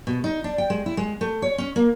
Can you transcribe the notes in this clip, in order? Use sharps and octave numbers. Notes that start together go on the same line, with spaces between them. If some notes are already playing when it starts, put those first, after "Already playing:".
B2
D#4
D4
G5
G#3
E4
G#3
A3
C#5
C#4
A#3